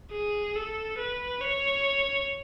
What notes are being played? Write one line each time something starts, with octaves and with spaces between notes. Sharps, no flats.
G#4
A4
B4
C#5